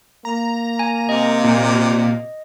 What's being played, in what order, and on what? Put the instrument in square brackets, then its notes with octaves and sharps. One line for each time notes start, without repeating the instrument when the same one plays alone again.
[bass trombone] A#3 [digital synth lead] A#5
[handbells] G#5
[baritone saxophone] C3 [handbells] D#5
[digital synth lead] A#2